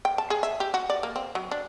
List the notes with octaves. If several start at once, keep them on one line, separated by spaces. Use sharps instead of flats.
G5
A5
G#4
E5
G4
F#4
D5
A#3
C4
F#3
D4